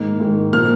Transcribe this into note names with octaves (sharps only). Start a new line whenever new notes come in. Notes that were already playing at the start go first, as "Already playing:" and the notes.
Already playing: G#2 D#3 A#3
G#2 D#3 A#3
A#2 F3 A#3 F6